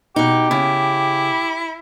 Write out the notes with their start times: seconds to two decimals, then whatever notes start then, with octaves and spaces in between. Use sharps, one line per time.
0.16 B2 D#4 G4
0.51 C#3 E4